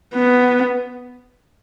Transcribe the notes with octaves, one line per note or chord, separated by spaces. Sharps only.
B3